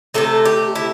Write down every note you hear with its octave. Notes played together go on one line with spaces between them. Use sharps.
C3 E3 A3 A4
G4
E4